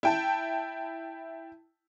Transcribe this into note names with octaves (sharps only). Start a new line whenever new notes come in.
E4 G5 A5